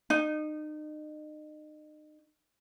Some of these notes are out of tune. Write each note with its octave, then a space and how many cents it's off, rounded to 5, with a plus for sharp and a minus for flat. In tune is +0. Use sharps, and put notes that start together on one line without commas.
D#4 -35